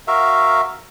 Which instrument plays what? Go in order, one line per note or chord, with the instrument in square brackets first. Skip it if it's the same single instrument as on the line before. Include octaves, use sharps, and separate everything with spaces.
[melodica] F#4 A#4 E5 F5